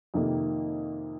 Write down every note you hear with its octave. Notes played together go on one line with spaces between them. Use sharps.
F2 C3 D#3 A#3